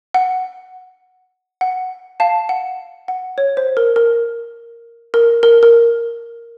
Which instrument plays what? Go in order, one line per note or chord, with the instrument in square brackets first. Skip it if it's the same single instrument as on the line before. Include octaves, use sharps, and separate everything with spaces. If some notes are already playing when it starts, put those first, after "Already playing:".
[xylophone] F#5
F#5
F5 A5
F#5
F#5
C#5
C5
A#4
A#4
A#4
A#4
A#4